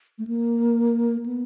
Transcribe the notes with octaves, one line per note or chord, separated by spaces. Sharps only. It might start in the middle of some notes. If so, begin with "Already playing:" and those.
A3
A#3
B3